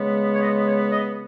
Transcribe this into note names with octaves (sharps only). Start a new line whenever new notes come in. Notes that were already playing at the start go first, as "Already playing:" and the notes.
Already playing: C#3 G#3 B3
C#5
D#5
C#5
D#5